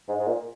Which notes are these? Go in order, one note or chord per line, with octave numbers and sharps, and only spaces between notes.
G#2
G#2
A#2